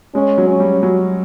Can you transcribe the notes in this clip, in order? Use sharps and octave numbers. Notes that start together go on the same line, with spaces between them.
G#3 C#4
F#3
C#4
G3
F#3